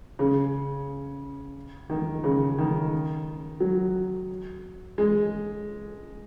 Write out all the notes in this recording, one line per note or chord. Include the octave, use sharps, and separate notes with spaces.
C#3
D#3
C#3
D#3
F#3
G#3